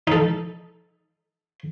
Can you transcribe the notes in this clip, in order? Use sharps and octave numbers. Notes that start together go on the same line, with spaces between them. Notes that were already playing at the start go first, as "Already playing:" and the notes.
D#4 A4